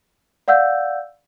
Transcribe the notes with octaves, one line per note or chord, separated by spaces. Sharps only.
D5 F5 F#5 E6 G6